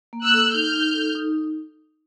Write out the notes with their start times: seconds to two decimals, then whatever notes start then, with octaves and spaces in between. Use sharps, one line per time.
0.13 A#3
0.23 E6 F#6
0.34 A4
0.54 D#4 F6 G6
0.74 D#4
0.94 A4
1.15 D#4